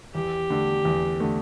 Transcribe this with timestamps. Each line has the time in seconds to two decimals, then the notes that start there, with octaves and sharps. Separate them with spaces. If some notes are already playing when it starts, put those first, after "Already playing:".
0.14 E2 G4
0.50 D3 A3
0.85 E2
1.20 D3 A3